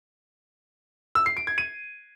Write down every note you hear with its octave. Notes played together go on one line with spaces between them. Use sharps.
E6
C7
D7
G#6
D#7